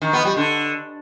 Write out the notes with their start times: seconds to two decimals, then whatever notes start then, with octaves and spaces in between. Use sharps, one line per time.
0.02 D#3
0.13 B3
0.25 G3
0.37 D3